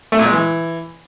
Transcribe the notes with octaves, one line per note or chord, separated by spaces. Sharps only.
A3
A#2
G#3
E3